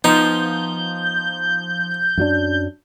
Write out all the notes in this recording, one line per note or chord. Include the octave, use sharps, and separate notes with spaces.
F3 B3 D#4 G6
F#2 F#3 D4